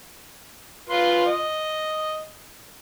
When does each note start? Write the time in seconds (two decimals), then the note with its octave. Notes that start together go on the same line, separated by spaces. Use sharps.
0.89 F4 B4 C6
1.26 D#5